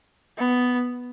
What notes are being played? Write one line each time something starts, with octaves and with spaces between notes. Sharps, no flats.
B3